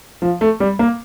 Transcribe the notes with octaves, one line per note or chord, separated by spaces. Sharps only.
F3
A3
G3
A#3